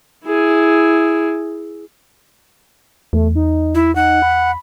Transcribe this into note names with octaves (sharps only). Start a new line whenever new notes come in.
E4 G#4
E2 A3
D#4
E4
D#4 F#5
B5